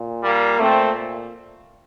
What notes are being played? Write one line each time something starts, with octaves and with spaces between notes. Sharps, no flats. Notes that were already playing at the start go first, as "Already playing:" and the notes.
Already playing: A#2
G3 A#3
A#2 A3 C4